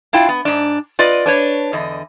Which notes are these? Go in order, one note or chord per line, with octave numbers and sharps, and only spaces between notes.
D4 E4 F4 G5
B3
G#2 D4
F4 B4 D5 D#5
D4 B4 C#5
E2 D3 D#5